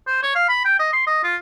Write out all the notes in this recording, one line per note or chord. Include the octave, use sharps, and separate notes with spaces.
C5
C#5
F5
B5
G5
D#5
C6
D#5
F4